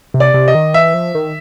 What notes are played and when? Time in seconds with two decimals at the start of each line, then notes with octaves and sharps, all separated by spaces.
0.14 C3
0.20 D5
0.34 C3
0.48 D#5
0.55 D#3
0.74 E3 E5
0.94 F3
1.15 D#3